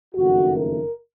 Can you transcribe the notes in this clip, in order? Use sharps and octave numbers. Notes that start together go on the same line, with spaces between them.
F#1 F2 D#3 A3 F#4
A#4